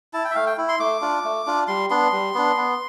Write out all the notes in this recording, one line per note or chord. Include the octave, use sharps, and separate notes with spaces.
E4 A5
G5
E5
A3 F5
G5
E4
C6
A3 D6
D4 F4
A3
D4 F4
G3 C6
B3 D4 C6
G3
B3 D4
B3